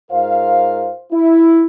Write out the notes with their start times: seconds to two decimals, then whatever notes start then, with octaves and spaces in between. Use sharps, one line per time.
0.11 G#2 F4 A#4 C5 F5
1.12 E4